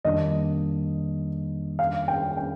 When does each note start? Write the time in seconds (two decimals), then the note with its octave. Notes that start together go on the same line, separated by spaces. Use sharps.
0.05 F2 D#3 G3 A#3 D4 D#5
1.79 F5
2.08 G5
2.37 G5